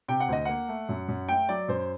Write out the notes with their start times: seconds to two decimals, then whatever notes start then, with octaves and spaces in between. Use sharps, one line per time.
0.08 C3 G5
0.20 F#5
0.29 D2 D#5
0.45 A#3 F#5
0.69 A3
0.89 F#2
1.09 F#2
1.29 A3 G5
1.49 F#3 D5
1.69 F#2 C5